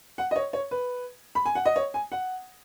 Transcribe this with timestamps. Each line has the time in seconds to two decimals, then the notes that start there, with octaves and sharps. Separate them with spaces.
0.18 F#5
0.31 D#5
0.36 C#5
0.53 C#5
0.71 B4
1.35 B5
1.46 G#5
1.55 F#5
1.66 D#5
1.76 C#5
1.94 G#5
2.12 F#5